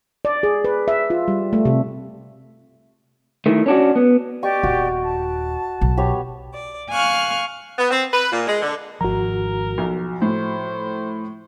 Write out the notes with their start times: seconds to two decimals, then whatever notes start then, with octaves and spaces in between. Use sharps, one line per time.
0.25 D5
0.43 G#4
0.65 B4
0.88 E5
1.10 F4
1.28 G3
1.53 A3
1.65 C3
3.46 D#3 A3 E4
3.66 C#4 D4 F#4
3.96 B3
4.43 G4 D5 D#5 G5 C#6
4.63 D#1 F#4
5.03 A5
5.81 B1
5.97 B3 G4 C#5
6.53 D5
6.92 F5 G#5 C#6 F6 F#6
7.78 B3
7.90 C4
8.12 B4
8.32 A#2
8.47 G#3
8.61 D3
9.01 G#1 F3 F#4 A#4 A#5
9.78 B1 F3
10.22 A2 C5